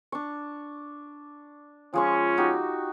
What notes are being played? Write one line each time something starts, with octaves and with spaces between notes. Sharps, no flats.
D4 C#6
F3 G#3 C#4 C#6
D#4 F#4 G4